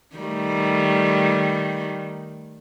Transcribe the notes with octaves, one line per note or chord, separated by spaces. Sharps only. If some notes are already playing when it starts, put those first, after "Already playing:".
D#3 G3 A3